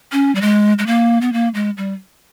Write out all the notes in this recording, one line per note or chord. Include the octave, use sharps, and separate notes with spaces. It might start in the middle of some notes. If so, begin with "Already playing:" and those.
C#4
G3
G#3
G#3
A#3
B3
A#3
G#3
G3